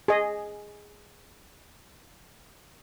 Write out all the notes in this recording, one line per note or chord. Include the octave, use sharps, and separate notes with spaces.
G#4 D#5